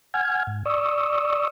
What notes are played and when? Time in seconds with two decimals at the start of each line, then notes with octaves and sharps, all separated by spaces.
0.14 F#5 G#5 F6 G#6
0.47 G#2
0.65 D5 C#6 D#6 E6